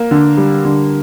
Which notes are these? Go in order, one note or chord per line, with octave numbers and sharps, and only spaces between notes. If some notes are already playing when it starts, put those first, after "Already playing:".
Already playing: A#3
D3
G3
D3